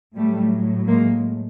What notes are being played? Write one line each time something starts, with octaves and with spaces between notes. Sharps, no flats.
A2 F#3 G3 A3
G#3 A#3